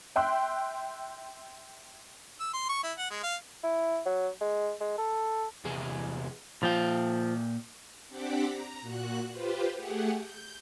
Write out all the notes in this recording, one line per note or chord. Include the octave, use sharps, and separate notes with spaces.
E5 G5 C6 E6 F#6
E6
C6
C#6
E4
F#5
G#3
F5
E4
F#3
G#3
G#3
A4
E2 C3 G#4
A#2 F3 G5
C4 D4 G4 F#5 D6 B6
A#5
A#2 F#4 F#6
F4 G4 B4 C5
A3 G4 G#4 F#5
G6